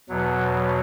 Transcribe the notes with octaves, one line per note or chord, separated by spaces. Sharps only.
E2 B2 F#3